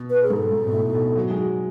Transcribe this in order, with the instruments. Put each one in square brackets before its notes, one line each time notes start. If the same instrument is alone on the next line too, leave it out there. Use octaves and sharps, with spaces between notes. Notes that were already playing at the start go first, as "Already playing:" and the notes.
Already playing: [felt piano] B2
[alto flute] B4
G#4
[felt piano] G#2 [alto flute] A4
[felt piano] G#2
B2
A2
B2
F#3
G#3
F#3